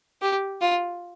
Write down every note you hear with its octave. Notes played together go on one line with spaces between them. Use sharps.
G4
F4